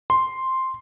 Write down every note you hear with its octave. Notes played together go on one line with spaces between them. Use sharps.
C6